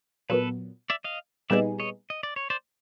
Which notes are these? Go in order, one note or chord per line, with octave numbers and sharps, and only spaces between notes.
A#2 F#3 B3 A4 B4
D5 E5
D#5 F5
A#2 G3 B3 D#4 G#4 D5 E5
C#5 D#5
D#5
D5
C#5
C5 D5